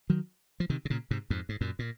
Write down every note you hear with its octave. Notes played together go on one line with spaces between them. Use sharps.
D#3 F#3
F3
C3 D#3
C3
A#2 C#3
G#2 C3
F2 G#2
G#2
F#2 A#2
A#2